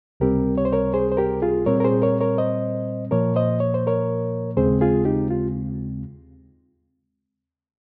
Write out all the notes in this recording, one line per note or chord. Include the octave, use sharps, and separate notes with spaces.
C#2 C3 G3 C4 G4 A#4
C#5
C5
A#4 C#5
G#4 C5
C5
G4 A#4
F4 G#4
A#2 G3 C4 A#4 C#5
A#4
G#4 C5
A#4 C#5
A#4 C#5
C5 D#5
A#2 F3 A#3 A#4 C#5
C5 D#5
C#5
C5
A#4 C#5
D#2 C#3 G#3 C4 G#4 C5
F4 G#4
D#4 G4
F4